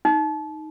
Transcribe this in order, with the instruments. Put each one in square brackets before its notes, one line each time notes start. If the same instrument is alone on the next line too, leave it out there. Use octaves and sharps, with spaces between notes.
[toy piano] D#4